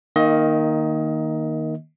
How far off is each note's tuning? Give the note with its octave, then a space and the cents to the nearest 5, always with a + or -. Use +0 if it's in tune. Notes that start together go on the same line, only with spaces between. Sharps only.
D#3 +0 A#3 +5 D#5 +25